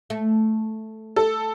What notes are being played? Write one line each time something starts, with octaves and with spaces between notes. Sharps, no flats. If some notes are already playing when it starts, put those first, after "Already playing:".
A3
A4